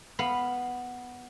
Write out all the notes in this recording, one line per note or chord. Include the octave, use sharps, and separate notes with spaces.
B3 F5 B5